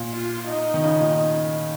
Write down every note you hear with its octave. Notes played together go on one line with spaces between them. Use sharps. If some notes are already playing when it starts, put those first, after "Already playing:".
Already playing: A#2
F4
D#4
D#3
C#3
A#2